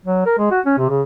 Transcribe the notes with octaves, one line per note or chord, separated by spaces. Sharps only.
F#3
A#4
G#3
F#4
C#4
C3
C#3